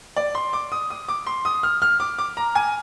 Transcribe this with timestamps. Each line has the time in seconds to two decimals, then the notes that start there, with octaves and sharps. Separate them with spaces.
0.16 D5
0.35 C6
0.53 D6
0.72 D#6
0.90 D#6
1.09 D6
1.27 C6
1.45 D#6
1.63 F6
1.82 F6
2.00 D6
2.19 D6
2.37 A#5
2.55 G#5